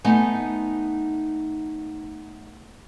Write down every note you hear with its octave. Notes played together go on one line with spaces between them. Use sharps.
A3 B3 D#4 D#5 G#5